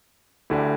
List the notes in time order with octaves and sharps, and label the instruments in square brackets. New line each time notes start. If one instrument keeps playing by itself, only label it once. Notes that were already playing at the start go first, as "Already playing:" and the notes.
[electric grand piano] D2 D3 A3 E4 G4